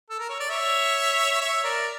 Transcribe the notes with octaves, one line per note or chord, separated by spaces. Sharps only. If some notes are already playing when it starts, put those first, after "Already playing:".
A4
A#4
C#5
D5
C#5 E5
C#5 E5
A#4 D5